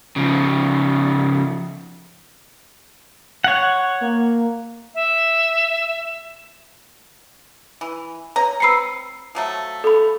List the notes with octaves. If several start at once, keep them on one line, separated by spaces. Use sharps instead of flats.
C#3 F3
C#5 F#5
A#3
E5
E3
B4 C#5 A#5
C4 B4 E6 C7 C#7
F3 F#3 A3
A4 B5